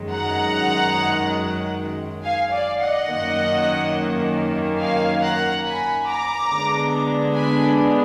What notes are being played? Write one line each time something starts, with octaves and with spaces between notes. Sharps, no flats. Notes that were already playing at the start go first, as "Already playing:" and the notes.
Already playing: F#2 D#3 G#3
F#5 A#5
F5 G#5
D5 F5
D#5 F#5
F#2 D#3 A#3
F5 G#5
F#5 A#5
G#5 B5
A#5 D6
D3 G#3 B3 D4
G#5 B5